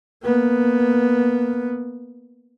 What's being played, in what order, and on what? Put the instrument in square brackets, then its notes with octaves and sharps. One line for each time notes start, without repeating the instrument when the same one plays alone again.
[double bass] A#3 B3